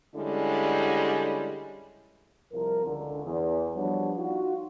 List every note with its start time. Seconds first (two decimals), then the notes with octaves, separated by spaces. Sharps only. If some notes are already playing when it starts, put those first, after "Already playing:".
0.15 D3 G3 G#3 C#4 E4
2.52 C2 F3 A#4
2.85 C#2 D3
3.24 E2
3.76 F3 G3 B3 D4 F#4 C#5
4.18 D#4 F4 F#4